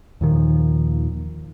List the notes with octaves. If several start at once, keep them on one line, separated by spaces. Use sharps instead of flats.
D#2 A#2 D#3 F3